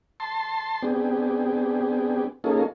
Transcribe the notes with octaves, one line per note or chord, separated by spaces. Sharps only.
A5 C6
B3 C4 D4 G4 G#4
A#3 C#4 D#4 F4 G#4 A4